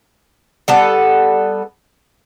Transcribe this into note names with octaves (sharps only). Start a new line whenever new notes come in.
G3 B3 A4